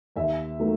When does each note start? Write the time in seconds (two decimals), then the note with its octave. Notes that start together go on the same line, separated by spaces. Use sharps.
0.16 D#2 E5
0.60 D#3 F#3 A3